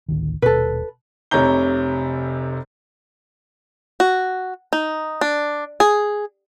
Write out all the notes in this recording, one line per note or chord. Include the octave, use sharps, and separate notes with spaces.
A1 D2 D#3
D#1 B2 A4 B4
F1 C3 C#5 A#5 G6 G7
F#4
D#4
D4
G#4